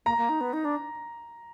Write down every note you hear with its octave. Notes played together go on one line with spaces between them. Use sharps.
A#3 A#5
A#3
D#4
B3
D#4
D4